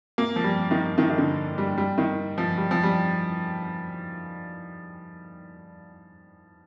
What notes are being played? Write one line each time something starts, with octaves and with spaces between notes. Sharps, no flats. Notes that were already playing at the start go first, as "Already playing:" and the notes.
A#3
F3
G3
D#3
D#3
D#3
D3
G3
G3
D#3
F3
G3
F3
G3